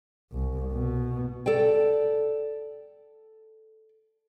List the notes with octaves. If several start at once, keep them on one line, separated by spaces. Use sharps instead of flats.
C2
B2
A4 D5 G5